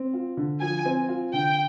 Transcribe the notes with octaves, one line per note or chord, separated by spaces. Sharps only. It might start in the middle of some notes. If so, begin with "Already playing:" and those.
Already playing: C4
F4
D3
F3 G#5
C4
F4
D3 G5